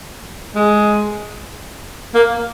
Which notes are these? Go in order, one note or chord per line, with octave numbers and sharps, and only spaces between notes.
G#3
A#3